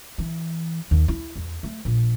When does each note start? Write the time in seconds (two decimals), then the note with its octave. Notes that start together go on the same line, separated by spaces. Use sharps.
0.18 E3
0.91 D#2
1.08 E4
1.36 E2
1.63 A3
1.85 A#1